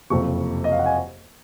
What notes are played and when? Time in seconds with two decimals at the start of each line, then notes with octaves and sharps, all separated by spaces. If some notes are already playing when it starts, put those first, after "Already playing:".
0.10 F#1 F2 C3 C#6
0.64 D#5
0.72 F5
0.79 F#5
0.86 G#5